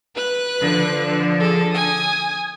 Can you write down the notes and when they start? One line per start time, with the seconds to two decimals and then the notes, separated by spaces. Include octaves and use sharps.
0.16 B4 F#6
0.60 D3 F3
1.40 G#4 A4
1.71 G#5 D#6